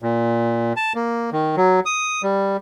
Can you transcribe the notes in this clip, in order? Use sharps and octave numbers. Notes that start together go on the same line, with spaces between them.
A#2
A5
A#3
D#3
F#3
D#6
G3